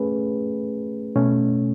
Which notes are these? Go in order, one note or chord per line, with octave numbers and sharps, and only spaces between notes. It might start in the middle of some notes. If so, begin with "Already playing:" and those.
Already playing: A3 C#4 G#4 B4
B2 A3 C#4